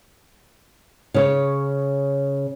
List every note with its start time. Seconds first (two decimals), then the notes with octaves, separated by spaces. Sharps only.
1.14 C#3 C#5